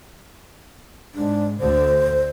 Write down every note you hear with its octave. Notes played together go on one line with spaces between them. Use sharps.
G#2 D4
D2 D3 C5